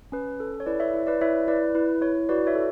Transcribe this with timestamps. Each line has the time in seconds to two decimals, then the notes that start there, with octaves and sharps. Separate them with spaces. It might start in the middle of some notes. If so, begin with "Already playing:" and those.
0.12 C#4 B4
0.40 A4
0.60 C#5
0.66 E4 B4 D5
0.80 C#5 E5
0.94 E4
1.07 B4 D5
1.21 E4 C#5 E5
1.47 E4 B4 D5
1.75 E4 B4
2.01 E4 C#5
2.29 F#4 B4 D5
2.47 C#5 E5
2.55 A4